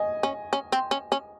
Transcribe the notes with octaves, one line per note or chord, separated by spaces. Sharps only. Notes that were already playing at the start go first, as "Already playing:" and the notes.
Already playing: D#5 G#5
C#4
C#4
C4
C#4
C#4